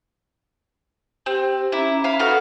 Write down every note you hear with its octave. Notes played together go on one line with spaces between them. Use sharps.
C4 G4
C#4 E4 A#5 D6
F5 B5
B3 F#4 A4 F5